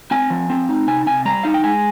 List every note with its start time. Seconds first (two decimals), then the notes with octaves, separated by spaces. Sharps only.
0.11 C4 G#5
0.30 F3
0.50 C4
0.69 D#4
0.87 C3 G#5
1.06 C3 G#5
1.25 G3 A#5
1.43 D#4 F5
1.54 G5
1.64 G#3 G#5